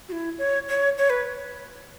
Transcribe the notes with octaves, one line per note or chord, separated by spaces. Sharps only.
F#4
E4
C#5
C#5
C#5
B4